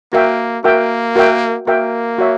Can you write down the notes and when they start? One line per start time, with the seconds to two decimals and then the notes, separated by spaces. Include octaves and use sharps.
0.13 A#3 F#4 A#4 E5 G5
0.64 A#3 F#4 A#4 E5 G5
1.16 F#4 A#4 E5 G5
1.67 A#3 F#4 A#4 E5 G5
2.18 F#4 C#5 E5